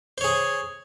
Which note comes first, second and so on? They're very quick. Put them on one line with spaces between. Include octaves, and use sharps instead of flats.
C5 C#5 G#4 G#5